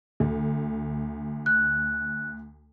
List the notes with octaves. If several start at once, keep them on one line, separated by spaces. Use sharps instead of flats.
D2
F#6